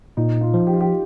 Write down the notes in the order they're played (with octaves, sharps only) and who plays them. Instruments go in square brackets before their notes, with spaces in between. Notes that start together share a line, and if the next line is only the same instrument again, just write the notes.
[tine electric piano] A#2 [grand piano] D#4
[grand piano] F4
[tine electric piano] F3
[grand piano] G4
F4
G4